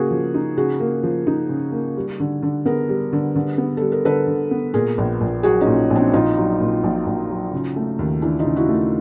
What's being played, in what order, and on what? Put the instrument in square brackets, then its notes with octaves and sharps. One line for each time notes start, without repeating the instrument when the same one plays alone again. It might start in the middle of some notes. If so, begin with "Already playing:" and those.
Already playing: [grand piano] C#3 A#3 [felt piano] F#4 G#4
[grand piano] F3
D#4
[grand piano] C#3 [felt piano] F#4 G#4
[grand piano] A#3
F3
D#4
C#3
A#3
G3
D3
D3
[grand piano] B3 [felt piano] G#4 A#4
[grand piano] G3
D3
D3
B3
[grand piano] G3 [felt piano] A4
[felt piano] A#4
[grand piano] D3 [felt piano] A4 B4
[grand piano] D3
B3
[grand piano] A#2 [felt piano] G#4 A#4
[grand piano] A#1
A#1
[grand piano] F#3 [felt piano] F#4 G#4
[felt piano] C#4 D#4
[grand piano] A#2
A#1
[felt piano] C4 D4
[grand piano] A#1 [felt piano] D#4 F4
[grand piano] F#3
A#2
A#1
A#1
F#3
C#3
A3
D#2
[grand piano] E3 [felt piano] D4 E4
[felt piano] D#4 F4
[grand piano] C#3
[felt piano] E4 F#4
[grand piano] A3